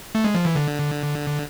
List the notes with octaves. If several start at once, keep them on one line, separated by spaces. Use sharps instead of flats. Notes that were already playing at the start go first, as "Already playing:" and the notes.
A3
G#3
F3
E3
D3